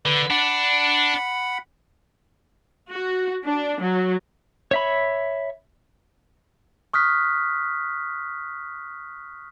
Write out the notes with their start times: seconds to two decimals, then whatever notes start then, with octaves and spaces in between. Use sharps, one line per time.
0.06 D3 B4
0.30 D4 F#5 B5
2.90 F#4
3.44 D4
3.80 F#3
4.71 C#5 E5 B5
6.94 C#6 D#6 F6 F#6 B6